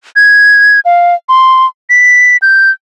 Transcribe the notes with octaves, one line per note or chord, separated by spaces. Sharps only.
G#6
F5
C6
B6
G6